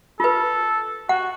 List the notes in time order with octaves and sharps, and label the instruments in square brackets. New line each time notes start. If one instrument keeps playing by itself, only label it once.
[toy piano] F4 B4 [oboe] A4
[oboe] F#4 [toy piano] F#5